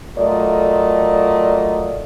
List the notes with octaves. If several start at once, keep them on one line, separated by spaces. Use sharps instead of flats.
F#3 A3 F4 A#4 D5 D#5